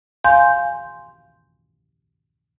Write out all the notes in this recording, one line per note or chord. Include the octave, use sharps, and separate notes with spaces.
F5 G#5 C6 G6